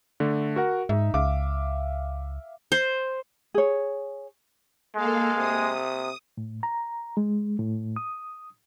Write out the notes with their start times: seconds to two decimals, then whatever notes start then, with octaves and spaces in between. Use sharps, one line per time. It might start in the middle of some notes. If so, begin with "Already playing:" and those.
0.20 D3 A3
0.56 F#4 A#4 F#5
0.89 G#2 D#4 E5
1.14 C#2 E5 F5 D6
2.72 C5
3.54 G#4 C#5
4.96 G#3 A#3 A4 F5
5.38 C3 D#6
6.37 A2
6.63 A#5
7.17 G#3
7.59 A2
7.96 D#6